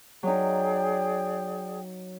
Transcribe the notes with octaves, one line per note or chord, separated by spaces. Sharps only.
F#3 D#4 G#4 D5 G5